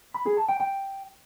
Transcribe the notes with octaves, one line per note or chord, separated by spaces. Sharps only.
B5
G#4
A5
G5
G5